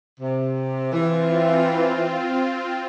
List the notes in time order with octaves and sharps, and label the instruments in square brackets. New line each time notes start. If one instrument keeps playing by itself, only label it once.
[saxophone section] C3
[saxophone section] E3 [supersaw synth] C4 F4